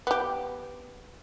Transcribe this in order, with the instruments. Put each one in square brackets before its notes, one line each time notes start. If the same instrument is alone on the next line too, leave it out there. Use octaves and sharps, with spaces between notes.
[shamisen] B3 G4